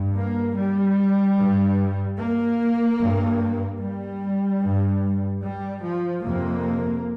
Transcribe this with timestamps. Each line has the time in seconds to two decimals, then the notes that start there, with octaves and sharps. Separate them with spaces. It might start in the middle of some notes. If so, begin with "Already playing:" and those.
Already playing: G2
0.16 A#3
0.56 G3
1.37 G2
2.19 A#3
3.00 G2
3.81 G3
4.62 G2
5.43 G3
5.84 F3
6.24 F2 C3 A#3